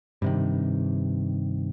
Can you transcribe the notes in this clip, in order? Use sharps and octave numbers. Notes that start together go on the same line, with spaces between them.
G2 C3 D#3